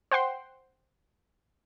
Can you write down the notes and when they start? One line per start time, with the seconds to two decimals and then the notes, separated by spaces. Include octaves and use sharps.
0.11 C5 F#5 G5 C6